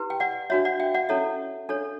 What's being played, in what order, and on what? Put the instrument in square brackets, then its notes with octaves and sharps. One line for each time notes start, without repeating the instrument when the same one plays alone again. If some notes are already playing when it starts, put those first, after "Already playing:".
Already playing: [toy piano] E4 G4 B4
G5
D5 F#5
D4 F#4 C#5 E5
D5 F#5
E5 G5
D5 F#5
C#4 E4 A4 C#5 E5
D4 A4 C#5